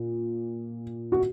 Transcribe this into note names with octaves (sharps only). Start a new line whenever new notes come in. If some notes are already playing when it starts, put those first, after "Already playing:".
Already playing: A#2
F#4